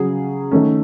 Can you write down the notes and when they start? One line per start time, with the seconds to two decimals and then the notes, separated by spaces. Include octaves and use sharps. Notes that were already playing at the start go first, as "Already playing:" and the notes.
Already playing: C#3 F#3 C#4 G#4
0.51 D#3 A3 C#4